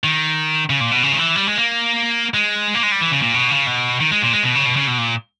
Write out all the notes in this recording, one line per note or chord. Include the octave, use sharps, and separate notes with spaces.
D#3
C#3
A#2
B2
C#3
D#3
E3
G3
G#3
A#3
G#3
A#3
G#3
G3
E3
C#3
A#2
B2
C#3
B2
D#3
G#3
A#2
G#3
B2
C#3
B2
C#3
B2
A#2